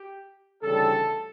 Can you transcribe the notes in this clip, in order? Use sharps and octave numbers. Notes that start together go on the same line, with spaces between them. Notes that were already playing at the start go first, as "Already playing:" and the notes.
Already playing: G4
D2 C#3 E3 G3 A4